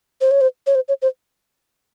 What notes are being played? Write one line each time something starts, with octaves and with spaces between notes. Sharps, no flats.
C5
C#5
C5
C#5
C5
C#5
C5